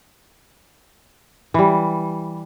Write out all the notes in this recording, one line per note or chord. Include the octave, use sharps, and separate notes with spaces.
E3 G3